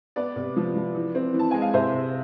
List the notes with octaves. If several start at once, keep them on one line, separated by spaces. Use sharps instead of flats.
B3 B4 D5
C3
F3
F3
E3
C4
E3
A5
G#3 G#5
F5
C3 C5 E5
C3